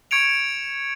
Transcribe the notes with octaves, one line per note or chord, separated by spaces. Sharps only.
C#6 G#6 C#7 D7 F7